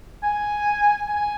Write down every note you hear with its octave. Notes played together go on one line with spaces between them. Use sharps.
G#5
G#5